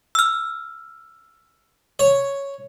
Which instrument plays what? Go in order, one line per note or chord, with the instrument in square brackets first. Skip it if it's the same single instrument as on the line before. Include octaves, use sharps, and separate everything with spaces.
[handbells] E6 F6
[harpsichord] C#5